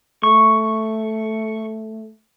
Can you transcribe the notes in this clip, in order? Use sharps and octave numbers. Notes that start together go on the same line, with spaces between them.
A3 C#6